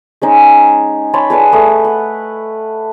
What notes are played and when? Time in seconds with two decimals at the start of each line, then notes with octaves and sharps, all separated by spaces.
0.22 G#3 C#4 D#4
1.14 C#5 A5 B5 C6
1.30 G#4 B4 D5 F#5
1.52 A3 D#6
1.84 F#5